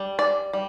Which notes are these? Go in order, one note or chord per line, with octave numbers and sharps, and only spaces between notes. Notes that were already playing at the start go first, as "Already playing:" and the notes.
Already playing: G3 D4
D5
G3